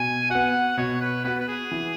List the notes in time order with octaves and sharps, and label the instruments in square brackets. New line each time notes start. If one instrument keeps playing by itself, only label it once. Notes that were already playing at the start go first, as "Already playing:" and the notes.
Already playing: [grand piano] B2 [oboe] G#5
[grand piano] B3 F#4 [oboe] F#5
[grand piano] B2 [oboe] C#5
[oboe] B4
[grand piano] B3 F#4 [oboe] B4
[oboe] B4
G#4
[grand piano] E3